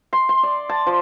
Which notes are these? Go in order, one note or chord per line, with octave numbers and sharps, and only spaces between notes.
C6
C6
D5
A5
F3